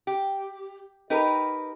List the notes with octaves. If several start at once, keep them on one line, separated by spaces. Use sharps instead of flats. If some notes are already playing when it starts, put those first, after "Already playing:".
G4
D#4 G4 A#4 B4